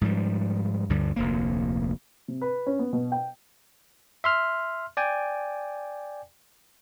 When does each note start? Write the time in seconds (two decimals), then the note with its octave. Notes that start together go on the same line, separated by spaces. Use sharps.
0.01 G#2 F3 G3
0.89 D2 G2 D3 G3
1.16 F1 D2 A#3
2.28 C3
2.41 B4
2.67 C#4
2.79 B3
2.93 B2
3.12 G5
4.24 E5 C6 F6
4.97 D5 G5 G#5